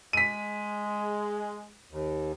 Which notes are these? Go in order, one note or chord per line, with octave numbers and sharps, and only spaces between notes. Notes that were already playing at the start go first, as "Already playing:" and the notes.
G#3 B6 D#7
D#2